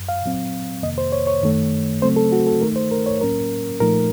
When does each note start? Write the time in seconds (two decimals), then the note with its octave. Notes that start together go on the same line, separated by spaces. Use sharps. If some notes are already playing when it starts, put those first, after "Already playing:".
Already playing: F#2
0.09 F5
0.23 A#2 F#3 C4
0.83 F2 C3 D#3 A#3 D#5
0.98 C5
1.12 C#5
1.27 C#5
1.42 F#2 D#3 A3
2.02 C#3 F#3 A3 C4 C5
2.16 A4
2.32 F#4
2.47 A4
2.62 D#3 A3 D#4 A#4
2.76 C5
2.91 A#4
3.06 C#5
3.21 A2 F#3 A#3 C#4 A#4
3.80 A#2 F3 A3 D#4 A#4